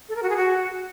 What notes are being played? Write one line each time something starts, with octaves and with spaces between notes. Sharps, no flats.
A4
A#4
F#4
G#4
F#4